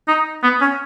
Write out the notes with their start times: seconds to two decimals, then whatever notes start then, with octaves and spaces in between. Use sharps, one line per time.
0.08 D#4
0.43 B3
0.61 C#4